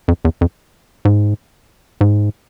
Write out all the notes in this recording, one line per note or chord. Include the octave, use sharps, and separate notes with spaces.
F2
E2
F2
G#2
G#2